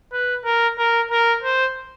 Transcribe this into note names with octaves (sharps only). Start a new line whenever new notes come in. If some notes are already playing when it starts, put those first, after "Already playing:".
B4
A#4
A#4
A#4
C5